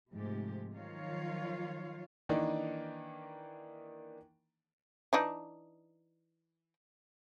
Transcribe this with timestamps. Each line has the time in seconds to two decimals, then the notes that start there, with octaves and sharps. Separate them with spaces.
0.11 G#2 C3 F3 G#3 A3 G4
0.72 D#3 F3 F#3 F4 C#5 F5
2.29 D#3 E3 A#3 D4 D#4
5.13 E3 D4 D#4